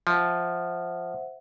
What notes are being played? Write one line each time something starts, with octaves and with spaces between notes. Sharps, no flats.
F3 C5 E5 F#5